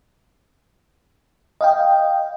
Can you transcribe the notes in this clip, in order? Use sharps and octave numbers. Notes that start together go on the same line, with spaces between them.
D#5 F5 G5